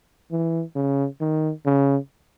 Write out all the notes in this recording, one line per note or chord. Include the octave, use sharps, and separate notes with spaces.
E3
C#3
D#3
C#3